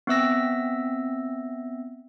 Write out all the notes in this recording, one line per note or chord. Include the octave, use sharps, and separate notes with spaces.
B3 C4 E5 E6 A#6